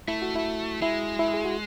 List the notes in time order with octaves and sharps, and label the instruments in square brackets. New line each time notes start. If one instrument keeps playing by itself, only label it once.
[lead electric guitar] A3 [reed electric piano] E4
[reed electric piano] F#4
E4
[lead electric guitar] G#3 [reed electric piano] E4
[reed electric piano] E4
G#4
F#4